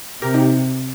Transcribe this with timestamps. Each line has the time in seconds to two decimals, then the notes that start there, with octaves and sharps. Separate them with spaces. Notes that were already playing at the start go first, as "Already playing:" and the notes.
0.22 C3 G4 A#4
0.34 D#4 G4